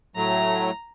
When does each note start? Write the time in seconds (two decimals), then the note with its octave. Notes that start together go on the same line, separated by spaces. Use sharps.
0.16 A2 F#3 A3 A#5